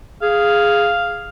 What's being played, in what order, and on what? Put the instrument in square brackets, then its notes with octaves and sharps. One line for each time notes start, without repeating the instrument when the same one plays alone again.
[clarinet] G#4 [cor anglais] F5